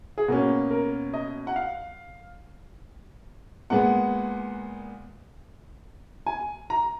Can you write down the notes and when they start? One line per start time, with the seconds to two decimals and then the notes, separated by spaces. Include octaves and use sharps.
0.18 G#4
0.28 B2 A#3 C#4 F#4
0.71 A#4
1.14 D#5
1.47 F#5
1.56 F5
3.70 A#2 G#3 B3 F#5
6.26 G#5
6.70 A#5